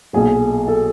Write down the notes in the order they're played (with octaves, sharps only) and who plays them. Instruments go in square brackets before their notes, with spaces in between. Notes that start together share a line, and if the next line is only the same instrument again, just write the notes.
[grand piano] B1 A#2 F#3 G#4
A4